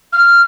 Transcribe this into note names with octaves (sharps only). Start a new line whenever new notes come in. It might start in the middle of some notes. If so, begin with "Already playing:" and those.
F6